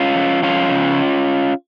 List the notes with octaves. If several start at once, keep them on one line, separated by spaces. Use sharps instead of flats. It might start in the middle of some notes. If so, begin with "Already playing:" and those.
Already playing: C#4 F4
F3
F2 C#4 F4
C#3 F3